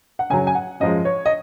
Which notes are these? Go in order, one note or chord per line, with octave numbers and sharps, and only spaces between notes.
F#5
F#2 C#3 F#3 G#5
G#5
F#5
F#2 F3 G#3 D#5
C#5
D#5